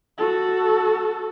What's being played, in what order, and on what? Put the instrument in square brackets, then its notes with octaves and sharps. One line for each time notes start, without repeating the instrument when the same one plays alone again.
[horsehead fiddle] F#4 A4